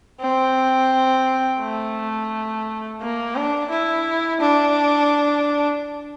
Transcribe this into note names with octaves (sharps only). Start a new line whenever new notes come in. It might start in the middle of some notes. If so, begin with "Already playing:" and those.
C4
A3
A#3
D4
E4
D4